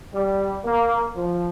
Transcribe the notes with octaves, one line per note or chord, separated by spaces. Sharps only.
G3
A#3
F3